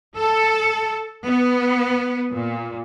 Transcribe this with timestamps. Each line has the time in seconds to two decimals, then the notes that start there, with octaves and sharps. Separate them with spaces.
0.17 A4
1.27 B3
2.34 A#2